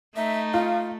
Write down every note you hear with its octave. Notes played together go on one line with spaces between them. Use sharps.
A3 D#4 E5
F4 F5